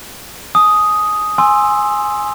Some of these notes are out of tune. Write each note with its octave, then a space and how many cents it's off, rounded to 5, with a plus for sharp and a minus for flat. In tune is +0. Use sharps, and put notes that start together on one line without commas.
G#5 +30 D#6 +5
G#5 +0 C6 +10 E6 +0